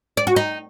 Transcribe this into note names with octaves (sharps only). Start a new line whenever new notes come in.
D5
F#4
D#4